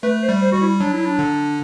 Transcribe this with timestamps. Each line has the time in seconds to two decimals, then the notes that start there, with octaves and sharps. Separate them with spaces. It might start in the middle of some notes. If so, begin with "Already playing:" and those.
0.03 A3 B4
0.23 C5
0.29 G3
0.42 C5
0.52 G3 F#4
0.61 E4
0.80 F#3 D4
0.93 E4
1.06 D4
1.19 D3